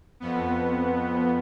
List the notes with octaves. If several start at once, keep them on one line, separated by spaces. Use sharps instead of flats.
F2 B3